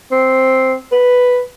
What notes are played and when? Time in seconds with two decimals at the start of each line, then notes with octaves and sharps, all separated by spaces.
0.11 C4
0.92 B4